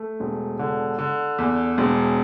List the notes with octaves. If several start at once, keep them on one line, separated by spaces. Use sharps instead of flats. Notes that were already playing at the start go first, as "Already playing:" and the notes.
Already playing: A3
E1
D3
D3
E2
E1